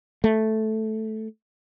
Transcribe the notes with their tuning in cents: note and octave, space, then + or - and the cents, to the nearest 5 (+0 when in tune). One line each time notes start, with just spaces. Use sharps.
A3 -5